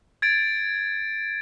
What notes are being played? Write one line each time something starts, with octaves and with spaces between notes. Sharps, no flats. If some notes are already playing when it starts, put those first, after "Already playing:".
G#6 A6 D7